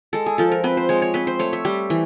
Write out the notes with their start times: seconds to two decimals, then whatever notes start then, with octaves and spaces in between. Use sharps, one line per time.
0.13 G#3 A4
0.26 G#4
0.38 F3 A4
0.52 A#4
0.64 C4 B4
0.77 C5
0.89 G#3 C#5
1.02 C#5
1.14 C4 B4
1.27 C5
1.39 A3 C#5
1.53 E5
1.65 G3
1.90 E3